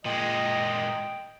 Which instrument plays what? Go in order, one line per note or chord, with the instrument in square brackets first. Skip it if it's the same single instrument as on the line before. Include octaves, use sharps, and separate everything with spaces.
[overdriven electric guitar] A#2 G#3 [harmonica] D#5 [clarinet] G5